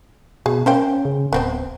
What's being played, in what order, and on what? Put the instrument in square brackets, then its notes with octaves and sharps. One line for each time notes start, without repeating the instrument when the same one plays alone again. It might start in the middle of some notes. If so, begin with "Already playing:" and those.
[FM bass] B2 [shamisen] G#4
[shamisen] A#3 C5 G5 [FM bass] C#4
[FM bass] C#3
[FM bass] D1 [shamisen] B3 C4 C5